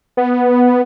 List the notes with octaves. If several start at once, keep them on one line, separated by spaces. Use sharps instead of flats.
B3